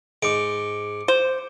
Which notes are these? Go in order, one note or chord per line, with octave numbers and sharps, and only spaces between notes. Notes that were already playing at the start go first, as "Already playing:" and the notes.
G#2 D6 C#7 D7
C5